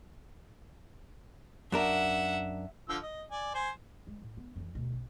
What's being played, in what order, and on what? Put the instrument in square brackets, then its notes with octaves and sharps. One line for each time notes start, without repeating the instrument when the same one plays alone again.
[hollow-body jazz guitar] F#2 D4 A#4 [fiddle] E5 F#5
[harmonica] D3 F3 E6
D#5
D5 G#5
C5 G#5
[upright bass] G#3
A2
B3
F2 E3
D2 B2
A#1